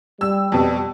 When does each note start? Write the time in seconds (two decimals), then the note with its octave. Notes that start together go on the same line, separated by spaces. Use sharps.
0.21 G3 E6
0.52 F2 B2